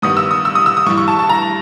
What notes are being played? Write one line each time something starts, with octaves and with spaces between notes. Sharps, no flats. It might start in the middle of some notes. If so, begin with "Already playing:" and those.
G2 D#3 G3 B3 D#6
E6
D#6
E6
D#6
E6
D#6
G2 E3 G3 C#6
C#6
A5
A5
A#5